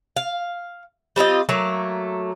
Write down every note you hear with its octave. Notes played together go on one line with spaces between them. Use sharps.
F5
G3 C4 F4 D#5
F#3 A3 A#3